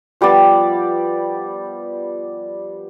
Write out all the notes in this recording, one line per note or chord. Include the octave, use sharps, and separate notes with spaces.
F3 G3 B3 D5